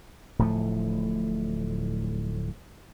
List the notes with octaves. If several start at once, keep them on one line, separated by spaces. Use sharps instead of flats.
D1 A2 F3 A3